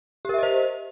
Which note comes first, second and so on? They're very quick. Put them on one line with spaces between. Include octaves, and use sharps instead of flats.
G4 A#4 E5 D#5 C5